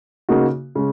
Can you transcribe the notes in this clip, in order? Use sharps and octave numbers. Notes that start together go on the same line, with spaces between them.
C#3 A#3 D#4 F#4
C#3 G#3